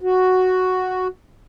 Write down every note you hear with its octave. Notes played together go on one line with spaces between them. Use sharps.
F#4